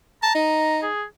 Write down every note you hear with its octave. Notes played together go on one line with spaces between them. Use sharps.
A5 A#5
D#4
G#4